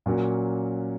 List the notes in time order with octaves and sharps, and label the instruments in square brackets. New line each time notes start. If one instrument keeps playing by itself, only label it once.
[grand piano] A#2 F#3 A#3 C#4 F#4